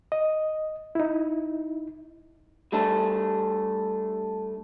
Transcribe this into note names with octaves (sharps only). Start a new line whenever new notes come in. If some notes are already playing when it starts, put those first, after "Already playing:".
D#5
D#4 E4
G3 A3 D4